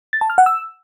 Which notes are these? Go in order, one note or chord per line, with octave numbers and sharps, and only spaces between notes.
A6
A5
F6
F#5
E6